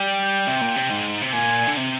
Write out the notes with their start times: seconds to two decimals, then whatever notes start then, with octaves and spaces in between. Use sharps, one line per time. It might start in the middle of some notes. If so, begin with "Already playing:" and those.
Already playing: G3 G5
0.47 C3
0.61 A#2
0.76 C3
0.90 G#2
1.22 C3
1.33 A#2 G#5
1.67 D3
1.77 C3